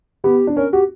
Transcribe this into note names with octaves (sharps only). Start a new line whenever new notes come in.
B3 G4
D4
C#4 A#4
F#4 G4